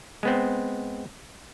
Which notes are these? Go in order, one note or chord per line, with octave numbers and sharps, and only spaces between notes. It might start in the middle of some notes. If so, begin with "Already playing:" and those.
G#3 B3 C4